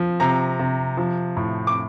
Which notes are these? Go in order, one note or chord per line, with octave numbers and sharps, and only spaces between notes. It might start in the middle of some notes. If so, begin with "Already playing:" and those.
Already playing: F3
C3 A#5
C3
F3
A2
D6